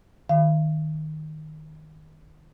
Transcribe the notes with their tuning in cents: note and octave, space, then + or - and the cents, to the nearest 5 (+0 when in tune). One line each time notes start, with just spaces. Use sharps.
D#3 -5 F5 -40